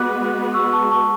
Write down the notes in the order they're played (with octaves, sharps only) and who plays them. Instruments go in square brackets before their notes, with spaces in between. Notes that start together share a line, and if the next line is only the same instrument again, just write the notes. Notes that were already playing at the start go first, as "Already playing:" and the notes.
Already playing: [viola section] G#3 B3 F#4 B4 [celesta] D6 F#6
[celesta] C#6 E6
A5 C#6
A5 C#6